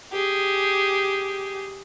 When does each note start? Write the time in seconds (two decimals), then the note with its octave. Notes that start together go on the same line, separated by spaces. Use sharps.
0.12 G4 G#4